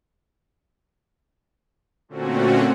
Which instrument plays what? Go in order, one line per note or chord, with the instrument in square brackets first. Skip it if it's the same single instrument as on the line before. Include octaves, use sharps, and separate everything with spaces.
[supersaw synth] A#2 D3 A3 C4 C#4 F#4